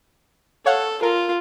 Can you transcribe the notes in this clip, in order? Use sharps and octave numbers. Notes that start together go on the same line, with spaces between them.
A4 C#5 F5 F#5
F4 A#4